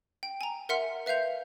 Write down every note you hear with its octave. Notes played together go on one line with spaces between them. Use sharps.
G5
G#5 A#5
A#4 E5 F#5 C6 F6
B4 E5 F5 G6 F7